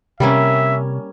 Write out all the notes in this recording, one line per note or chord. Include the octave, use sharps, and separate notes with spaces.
C3 G3 A#3 C#4 E5